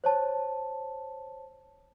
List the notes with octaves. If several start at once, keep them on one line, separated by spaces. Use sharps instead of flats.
C5 C#5 A5